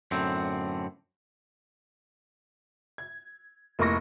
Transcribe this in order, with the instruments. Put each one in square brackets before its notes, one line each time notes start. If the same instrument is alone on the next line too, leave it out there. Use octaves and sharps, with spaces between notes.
[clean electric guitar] F#2 A2 D3 C4
[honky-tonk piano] G#6
F1 A#3 E4 C#6 A#6